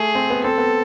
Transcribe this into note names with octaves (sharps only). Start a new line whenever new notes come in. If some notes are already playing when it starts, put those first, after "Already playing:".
Already playing: A3 G#4
C4
B3
C4 A4
B3